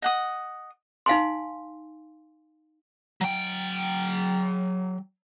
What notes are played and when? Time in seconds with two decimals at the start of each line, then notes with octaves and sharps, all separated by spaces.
0.02 D#5 F#5 D#6
1.06 D#4 F5 G#5 C6
3.21 F#3 G5